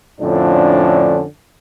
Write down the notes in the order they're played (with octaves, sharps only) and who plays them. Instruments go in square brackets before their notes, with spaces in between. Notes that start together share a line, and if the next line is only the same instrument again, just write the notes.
[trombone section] F2 A2 D3 F3 C#4 D4